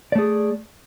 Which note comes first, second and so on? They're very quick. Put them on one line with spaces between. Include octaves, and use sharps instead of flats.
D5 A3 G#4